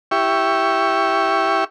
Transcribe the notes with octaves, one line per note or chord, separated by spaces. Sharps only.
E4 G4 C#6